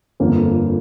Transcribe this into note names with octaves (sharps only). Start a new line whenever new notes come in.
G1 F2 D3 F3 A#3